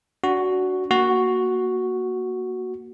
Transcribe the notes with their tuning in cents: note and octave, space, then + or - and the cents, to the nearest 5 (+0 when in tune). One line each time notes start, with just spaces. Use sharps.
D4 -25 F#4 +5
A#3 +5 F#4 +0